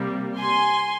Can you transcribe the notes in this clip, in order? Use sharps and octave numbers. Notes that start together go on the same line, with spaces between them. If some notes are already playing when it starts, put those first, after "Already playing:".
Already playing: C3 G3 A#3
G#5 C6